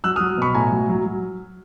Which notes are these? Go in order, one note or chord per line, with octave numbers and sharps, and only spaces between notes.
F#3 E6 F#6
D#6 F6
F#3
B2 B5 C#6
A2 G#5 A#5
F#3
F#3
F#3